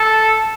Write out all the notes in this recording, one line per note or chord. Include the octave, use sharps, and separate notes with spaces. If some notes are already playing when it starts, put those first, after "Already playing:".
Already playing: A4